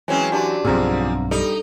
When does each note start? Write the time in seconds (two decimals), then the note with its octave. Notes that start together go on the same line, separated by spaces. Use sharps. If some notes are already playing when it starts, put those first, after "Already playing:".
0.08 E3 F#3 G#3 C4 C#4 G#5
0.32 D4 F#4 G4 A5
0.65 B1 G2 F3 B3 C4 G4 G#4 A#5
1.31 G3 D#4 A4